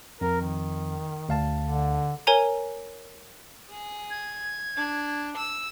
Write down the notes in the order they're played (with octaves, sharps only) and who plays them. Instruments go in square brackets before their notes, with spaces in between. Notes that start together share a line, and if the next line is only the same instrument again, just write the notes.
[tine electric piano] F2 [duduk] A#4
[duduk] D#3
[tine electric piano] D2 F5 A5
[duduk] D3
[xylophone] A#4 C#5 G#5 A#5
[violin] G#4
[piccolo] G#6
[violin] D4
E6